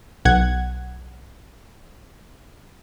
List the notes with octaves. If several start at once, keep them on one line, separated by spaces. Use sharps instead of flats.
B1 F#5 G#6